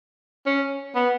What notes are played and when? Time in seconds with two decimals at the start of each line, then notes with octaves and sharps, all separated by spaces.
0.47 C#4
0.96 B3